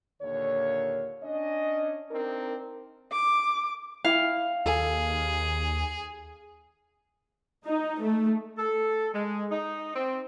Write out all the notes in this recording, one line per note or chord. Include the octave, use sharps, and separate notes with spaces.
D#2 A#2 D3 A#3 C#5
C#4 D4 D#5
C4 D4 D#4 A#4
D6
E4 F5 G5
D#2 G#4 A4 G#5
D#4
A3
A4
G#3
D#4
C4